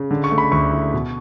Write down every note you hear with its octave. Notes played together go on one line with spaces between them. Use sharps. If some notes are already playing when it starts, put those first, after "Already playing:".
Already playing: C#3
D3
C#6
A3
B5
D2 C#6
E4
B2